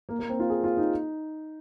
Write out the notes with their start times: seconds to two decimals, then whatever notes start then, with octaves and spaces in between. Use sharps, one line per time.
0.09 A#3
0.19 A#3
0.29 C4
0.40 F4
0.50 G#4
0.64 F4
0.77 D#4